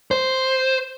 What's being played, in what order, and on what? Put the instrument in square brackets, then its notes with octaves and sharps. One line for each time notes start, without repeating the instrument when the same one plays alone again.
[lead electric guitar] C5